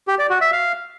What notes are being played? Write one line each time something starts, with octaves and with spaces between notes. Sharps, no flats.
G4
D5
F#4
E5
F5